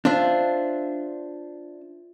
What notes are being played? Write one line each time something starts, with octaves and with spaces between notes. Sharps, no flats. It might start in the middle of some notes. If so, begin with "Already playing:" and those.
D4 F4 C5 E5